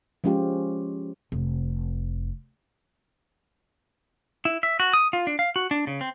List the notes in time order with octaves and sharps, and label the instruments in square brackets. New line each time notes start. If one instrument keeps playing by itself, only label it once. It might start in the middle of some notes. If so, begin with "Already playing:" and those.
[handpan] F3 G#3 C#4 F4 G4
[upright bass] F1
[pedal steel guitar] E4
E5
F#4
D#6
F4
D4
F5
F#4
D4
C#3
C4